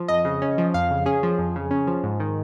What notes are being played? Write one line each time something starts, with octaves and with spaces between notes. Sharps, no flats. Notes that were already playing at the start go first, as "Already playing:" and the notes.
Already playing: F3
F2 D#5
C#3
C#4
F3
F2 F5
C#3
C#4 G#4
F3
F2
C#3
C#4
F3
G#2
D#3